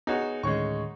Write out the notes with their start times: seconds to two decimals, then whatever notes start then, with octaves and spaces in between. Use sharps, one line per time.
0.07 B3 D#4 F#4 G#4 C#5
0.43 D2 A2 D#3 G#3 C#4 C#6